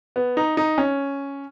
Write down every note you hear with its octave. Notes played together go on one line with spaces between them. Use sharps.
B3
D#4
D#4
C#4